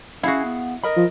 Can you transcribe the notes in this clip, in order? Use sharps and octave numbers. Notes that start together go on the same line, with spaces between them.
C#4 E4 F#4 G#4 F5 F#5
B3
A#4 D#5 B5
F3